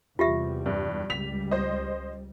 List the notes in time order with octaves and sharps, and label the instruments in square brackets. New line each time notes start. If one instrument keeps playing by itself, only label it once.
[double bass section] E2 C3 G3 [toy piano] F4 G4 E5
[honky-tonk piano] G2
[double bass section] C#2 G3 [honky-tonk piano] B6 F7
[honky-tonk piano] C5 D#5